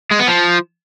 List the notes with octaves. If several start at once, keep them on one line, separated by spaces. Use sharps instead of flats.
G#3
B3
F3